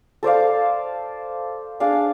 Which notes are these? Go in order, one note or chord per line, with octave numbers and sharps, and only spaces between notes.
A4 C5 D5 F5
D4 G#4 D5 F5